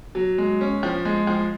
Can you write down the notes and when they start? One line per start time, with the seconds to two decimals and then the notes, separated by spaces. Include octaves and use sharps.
0.15 F#3
0.38 G#3
0.61 C#4
0.83 F3
1.05 G#3
1.27 F3